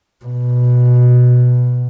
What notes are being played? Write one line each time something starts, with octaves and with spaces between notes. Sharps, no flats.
B2